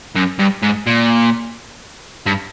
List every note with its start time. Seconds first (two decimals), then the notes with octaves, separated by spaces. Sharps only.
0.16 F#2
0.39 G2
0.63 G#2
0.86 A#2
2.26 G2